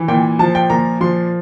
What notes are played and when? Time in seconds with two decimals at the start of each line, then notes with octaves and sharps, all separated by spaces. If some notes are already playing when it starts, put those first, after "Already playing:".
Already playing: E3
0.08 A#2 G5
0.39 F3 A5
0.55 G5
0.70 A#2 A#5
1.01 F3 C6